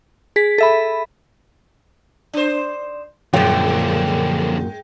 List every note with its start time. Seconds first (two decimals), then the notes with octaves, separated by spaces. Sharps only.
0.36 G#4 B6
0.58 A4 E5 B5
2.33 D4 C5
3.33 F#2 A#2 D3 F3 G#3 G5